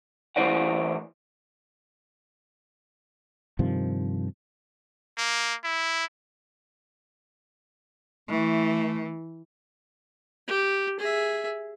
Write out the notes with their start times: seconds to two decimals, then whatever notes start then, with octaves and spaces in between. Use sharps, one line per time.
0.36 A2 E3 E4 C5 D5 F#5
3.59 G2 C3 D#3 F3
5.18 A#3
5.64 E4
8.29 E3 A3
10.48 G4
11.00 G#4 E5